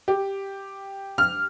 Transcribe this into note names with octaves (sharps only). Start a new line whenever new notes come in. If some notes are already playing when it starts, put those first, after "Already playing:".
G4
F6